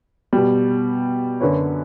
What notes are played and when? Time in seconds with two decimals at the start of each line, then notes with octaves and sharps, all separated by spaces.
0.33 B2 G3
1.40 F#2 D3 F#3 B4 C#5